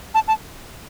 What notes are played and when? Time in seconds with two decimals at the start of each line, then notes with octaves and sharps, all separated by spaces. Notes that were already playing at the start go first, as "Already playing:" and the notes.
0.14 A5
0.28 A5